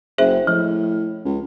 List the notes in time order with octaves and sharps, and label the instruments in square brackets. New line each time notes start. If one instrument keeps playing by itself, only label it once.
[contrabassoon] F#1 [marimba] G#4 C5 E5
[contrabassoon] A2 [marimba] F3
[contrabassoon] C#2